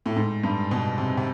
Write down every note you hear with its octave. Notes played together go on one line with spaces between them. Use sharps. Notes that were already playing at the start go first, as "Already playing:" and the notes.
A2
G#2
G2
B2
C3
C3